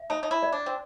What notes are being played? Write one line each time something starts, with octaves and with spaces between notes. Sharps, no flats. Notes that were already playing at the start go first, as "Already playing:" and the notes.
Already playing: E5
D#4 A5
D#4
E4
D5
D4
C4